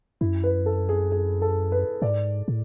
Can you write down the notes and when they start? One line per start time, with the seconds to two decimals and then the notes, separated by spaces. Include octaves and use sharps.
0.21 F#2 E4
0.44 B4
0.66 A4
0.89 G#4
1.12 G#4
1.42 A4
1.72 B4
2.02 G#2 D5
2.48 A2